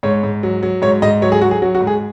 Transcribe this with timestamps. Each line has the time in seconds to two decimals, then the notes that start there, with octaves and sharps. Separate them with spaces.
0.03 G#2 C#5
0.23 G#2
0.43 F#3
0.63 F#3
0.82 G#2 C#5
1.02 G#2 D#5
1.22 F#3 C#5
1.32 G#4
1.41 F#3 F#4
1.51 G#4
1.62 F#3 F#4
1.75 F#4
1.81 G#2
1.87 G#4